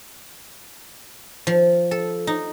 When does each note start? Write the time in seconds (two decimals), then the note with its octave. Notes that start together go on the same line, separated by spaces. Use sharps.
1.47 F3
1.91 A4
2.27 D#4